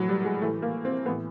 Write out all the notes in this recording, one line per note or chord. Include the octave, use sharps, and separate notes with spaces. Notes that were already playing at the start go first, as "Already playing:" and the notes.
Already playing: A2 E3 F#3
G3
G#3
A2 E3 A3
A#3
C4
A2 E3 B3